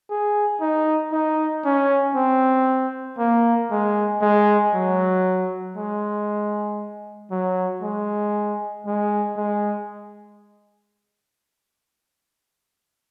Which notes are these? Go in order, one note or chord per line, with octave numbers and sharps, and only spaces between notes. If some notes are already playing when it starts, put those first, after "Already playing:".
G#4
D#4
D#4
C#4
C4
A#3
G#3
G#3
F#3
G#3
F#3
G#3
G#3
G#3